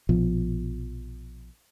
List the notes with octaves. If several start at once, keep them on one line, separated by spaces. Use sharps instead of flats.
A#1 B2 F3